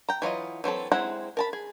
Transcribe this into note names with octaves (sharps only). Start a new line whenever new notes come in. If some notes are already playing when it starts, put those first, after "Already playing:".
G5 A#5
E3 F#3 F4 D#5
E3 F#3 C4 A4
G#3 C4 E4 F#5 A#5
A#4 A5 B5
G#4